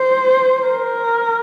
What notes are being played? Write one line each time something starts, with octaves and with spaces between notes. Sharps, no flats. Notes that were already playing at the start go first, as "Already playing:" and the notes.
Already playing: C5
A#4